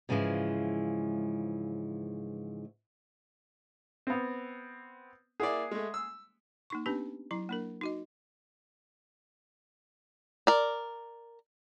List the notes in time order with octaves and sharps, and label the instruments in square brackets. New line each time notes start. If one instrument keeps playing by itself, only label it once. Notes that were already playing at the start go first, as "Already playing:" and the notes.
[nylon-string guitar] G#2 C#3 E3 F3 G#3
[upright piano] B3 C4
[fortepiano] A#3 E4 D5 [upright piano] G#4 F#5
[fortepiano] G#3 A3
E6
[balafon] A#3 D#4 C#6
B3 C#4 D4 G4 B4
F#3 E4 A#5
A#3 D4 A#4
D#4 F#4 D#5
[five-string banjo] A#4 D5